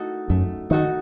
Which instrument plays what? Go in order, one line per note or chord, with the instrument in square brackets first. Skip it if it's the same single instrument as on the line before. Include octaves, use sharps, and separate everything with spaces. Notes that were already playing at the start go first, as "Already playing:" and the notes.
Already playing: [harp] A3 D#4 F#4 A4
[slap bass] F#2 [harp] A3
[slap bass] D#3 [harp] D#4 F#4 A4